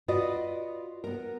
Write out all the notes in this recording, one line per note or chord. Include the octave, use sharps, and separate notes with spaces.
F4 F#4 B4 D5 D#5
B3 A#4